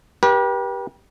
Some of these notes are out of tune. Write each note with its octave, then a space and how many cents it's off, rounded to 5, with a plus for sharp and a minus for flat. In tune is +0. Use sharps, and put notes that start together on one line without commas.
G4 +0 B4 -45